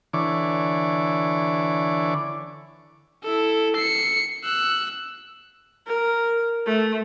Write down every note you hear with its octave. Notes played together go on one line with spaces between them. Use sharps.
D3 E3 C#5 D6
E4 A4
C7 C#7
E6 F#6
A#4
A3